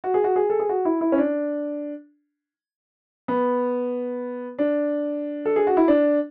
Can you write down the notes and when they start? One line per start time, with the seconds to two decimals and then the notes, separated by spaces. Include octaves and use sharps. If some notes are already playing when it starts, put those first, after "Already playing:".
0.04 F#4
0.14 G#4
0.24 F#4
0.36 G#4
0.50 A4
0.59 G#4
0.69 F#4
0.85 E4
1.01 E4
1.12 C#4
1.18 D4
3.28 B3
4.59 D4
5.45 A4
5.56 G#4
5.67 F#4
5.77 E4
5.88 D4